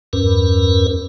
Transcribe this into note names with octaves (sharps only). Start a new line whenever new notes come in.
E2 G2 C#4 A#4 B4